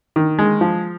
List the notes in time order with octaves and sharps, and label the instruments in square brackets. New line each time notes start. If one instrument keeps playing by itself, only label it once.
[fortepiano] D#3
G#3
F3